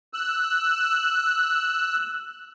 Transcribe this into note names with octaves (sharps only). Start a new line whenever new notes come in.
E6 F#6